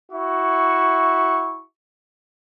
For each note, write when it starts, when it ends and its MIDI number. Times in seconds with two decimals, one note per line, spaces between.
0.12 1.61 64
0.12 1.61 66
0.12 1.61 76
0.12 1.61 85